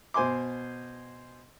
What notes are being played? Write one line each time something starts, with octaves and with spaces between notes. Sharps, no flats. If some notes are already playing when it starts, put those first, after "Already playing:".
B2 C5 G#5 C6 D6